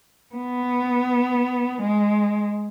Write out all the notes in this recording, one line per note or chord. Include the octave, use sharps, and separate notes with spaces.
B3
G#3